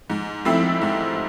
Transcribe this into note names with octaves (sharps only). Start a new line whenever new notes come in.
G#2
F3 A3 C4 E4
G#2